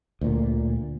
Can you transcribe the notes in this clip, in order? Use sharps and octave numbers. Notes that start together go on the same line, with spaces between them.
D2 A#2